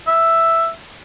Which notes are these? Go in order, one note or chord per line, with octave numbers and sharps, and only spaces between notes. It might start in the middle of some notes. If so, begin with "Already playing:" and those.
E5